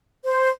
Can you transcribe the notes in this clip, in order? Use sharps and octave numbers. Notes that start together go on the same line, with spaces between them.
C5